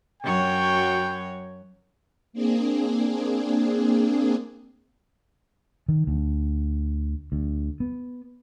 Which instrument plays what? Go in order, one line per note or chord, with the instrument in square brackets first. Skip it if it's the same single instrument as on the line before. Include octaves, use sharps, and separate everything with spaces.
[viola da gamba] F#2 F#3 C#5 [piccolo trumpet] G5
[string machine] A#3 C4 D4 G#4
[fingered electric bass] D#3
D2
D2
B3